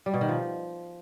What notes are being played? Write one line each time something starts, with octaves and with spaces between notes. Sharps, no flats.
G3
B2
D#3
F3